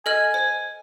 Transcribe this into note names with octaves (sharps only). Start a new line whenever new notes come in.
A4 D#5 G#5 F6
C5